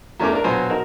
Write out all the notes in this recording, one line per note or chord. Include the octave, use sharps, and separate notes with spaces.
E2 A3 C#4 A#4 D6
D4 A#4
A#1 B2 F#3 B3 C5 G#5
D#4 F#4 A#4